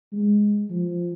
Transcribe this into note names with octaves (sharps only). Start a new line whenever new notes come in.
G#3
F3